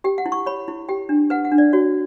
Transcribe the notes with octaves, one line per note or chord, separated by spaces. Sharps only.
G4 G5
F#5
E4
C#6
C#5 B5
E4
G4 G5
D4
B4 F#5
F#5
D4
D5
F#4 C#5